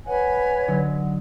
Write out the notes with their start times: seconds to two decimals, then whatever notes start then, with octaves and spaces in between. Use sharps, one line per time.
0.06 B4 C#5 F#5 G#5
0.68 D3 F#3 D#4